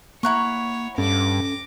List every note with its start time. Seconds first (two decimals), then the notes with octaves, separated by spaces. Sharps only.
0.23 A#3 E4 C#5 F#5 A#5 C#6
0.98 G2 C#4 A4 D6 A#6